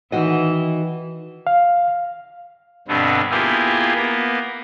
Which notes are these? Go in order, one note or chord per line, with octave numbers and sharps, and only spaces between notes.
D#3 E3 F#4 D#5
F5
G2 B2 D3 B3 C4
A#3 B3 E4 F4 G4 G#4
A#3 B3